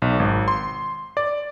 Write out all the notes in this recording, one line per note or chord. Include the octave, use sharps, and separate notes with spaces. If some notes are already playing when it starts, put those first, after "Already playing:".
B1
G#1
C6
D5